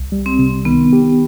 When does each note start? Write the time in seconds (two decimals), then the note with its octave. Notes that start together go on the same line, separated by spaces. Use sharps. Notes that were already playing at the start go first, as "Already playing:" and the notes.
Already playing: C2
0.12 G3
0.26 C4
0.39 C3
0.65 D#3 B3
0.93 G4